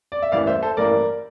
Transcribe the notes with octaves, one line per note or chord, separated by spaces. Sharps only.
D5
E5
A1 G2 E3 A#3 D5 F5
C5 E5
A4 C5
A1 G2 E3 A#3 A#4 D5